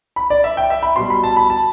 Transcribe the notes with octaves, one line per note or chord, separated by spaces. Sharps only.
B5
D5
E5
G5
E5
B5
B2 G3 C6
B5
A5
B5
A5